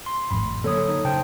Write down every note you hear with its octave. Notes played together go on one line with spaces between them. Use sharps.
C6
G#1 F2 A2 B5
D3 F#3 A#3 A4 C#5 D#6
D#4
C#3 C5 G5 A5